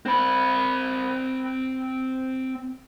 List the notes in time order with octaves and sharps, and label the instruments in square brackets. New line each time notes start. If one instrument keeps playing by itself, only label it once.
[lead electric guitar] C4 B5